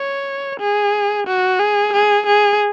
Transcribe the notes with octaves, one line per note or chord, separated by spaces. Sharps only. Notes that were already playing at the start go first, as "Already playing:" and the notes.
Already playing: C#5
G#4
F#4
G#4
G#4
G#4